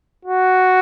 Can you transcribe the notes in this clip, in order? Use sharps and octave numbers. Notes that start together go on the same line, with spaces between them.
F#4